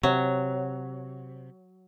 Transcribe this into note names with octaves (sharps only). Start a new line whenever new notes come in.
C3 F#3